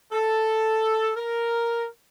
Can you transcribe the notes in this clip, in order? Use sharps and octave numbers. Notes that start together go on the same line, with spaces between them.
A4
A#4